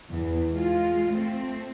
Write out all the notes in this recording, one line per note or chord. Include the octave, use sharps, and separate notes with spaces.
E2 E3
G#3 F4
A3 C4